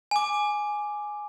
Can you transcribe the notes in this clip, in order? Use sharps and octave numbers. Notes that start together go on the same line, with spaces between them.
G#5 D6